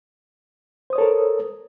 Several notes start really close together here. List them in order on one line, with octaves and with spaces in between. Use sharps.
C5 D#6 C#5 A4 A#4